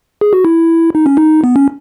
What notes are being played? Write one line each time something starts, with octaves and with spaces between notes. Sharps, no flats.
G#4
F#4
E4
D#4
C#4
D#4
B3
C#4